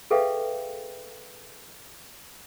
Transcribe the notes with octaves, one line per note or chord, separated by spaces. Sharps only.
G#4 A4 B4 E5 F5 G5